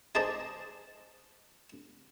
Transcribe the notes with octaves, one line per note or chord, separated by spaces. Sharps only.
D#4 G#4 C5 D5 A5